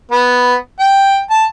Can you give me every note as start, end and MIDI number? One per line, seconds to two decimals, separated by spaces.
0.12 0.55 59
0.80 1.20 79
1.30 1.45 81